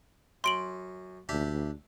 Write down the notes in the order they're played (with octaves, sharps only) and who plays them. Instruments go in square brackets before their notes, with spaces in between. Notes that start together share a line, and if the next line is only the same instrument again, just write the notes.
[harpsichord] F#2 [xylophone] C6 D7 F#7
[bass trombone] D2 [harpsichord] D4 G4 E5